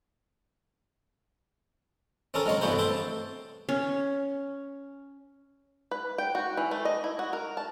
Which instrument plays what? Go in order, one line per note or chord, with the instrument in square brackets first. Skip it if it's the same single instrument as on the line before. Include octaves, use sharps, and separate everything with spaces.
[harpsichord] C4 C#4 A4 A#4
F#3 G#3 C#5
E2 G2 A3 F#4 C5
C4 A4 C5 A5
[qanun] C#4
[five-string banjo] B4
G5
F#4
E3
A3
D#5
E4
F#4
A#4
A5